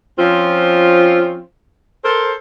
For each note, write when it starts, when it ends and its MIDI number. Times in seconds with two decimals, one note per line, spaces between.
0.19 1.41 53
0.19 1.41 60
0.19 1.41 61
0.19 1.41 65
2.05 2.32 69
2.05 2.32 70
2.05 2.32 72